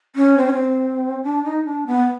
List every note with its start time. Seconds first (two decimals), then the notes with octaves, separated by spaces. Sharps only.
0.16 C#4
0.38 C4
0.46 C#4
0.54 C4
1.23 D4
1.44 D#4
1.65 D4
1.87 B3